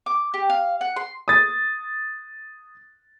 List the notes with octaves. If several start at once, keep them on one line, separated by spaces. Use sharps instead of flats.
D6
G4
F5
F#5
C6
D#6 A6